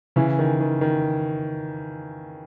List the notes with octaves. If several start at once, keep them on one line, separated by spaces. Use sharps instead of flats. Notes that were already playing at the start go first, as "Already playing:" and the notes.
C#3 E3
D#3
D#3
D#3